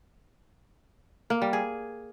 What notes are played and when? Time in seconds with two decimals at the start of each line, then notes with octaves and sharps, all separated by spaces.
1.30 A#3
1.42 G3
1.53 G#4